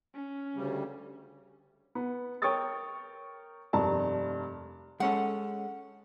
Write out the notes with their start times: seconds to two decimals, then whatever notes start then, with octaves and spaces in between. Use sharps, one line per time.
0.14 C#4
0.56 D2 C#3 G3
1.95 B3
2.42 A#4 C#5 G5 C#6 D#6 A6
3.73 F1 G2 A#4 A5 A#5
5.00 G#3 C#4 A4 F#5